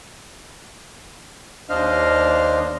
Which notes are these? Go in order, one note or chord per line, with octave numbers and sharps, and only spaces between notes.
D#2 D4 C5 D#5 F5 F6